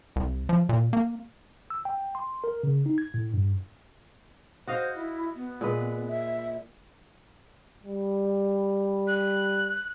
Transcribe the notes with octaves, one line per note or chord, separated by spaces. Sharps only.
C2
F3
A#2
A#3
E6
G5
C6
A#4
C#3
D#4
G#6
A2
G2
F#4 C5 D#5 F5
E4
B3
A#2 G#3 B4
E5
G3
F#6